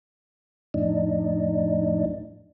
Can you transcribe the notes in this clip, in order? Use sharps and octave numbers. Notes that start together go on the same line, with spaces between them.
F2 A2 D4 D#4